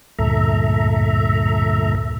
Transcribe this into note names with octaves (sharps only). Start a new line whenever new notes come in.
D2 G2 A#2 A4 E5 A#5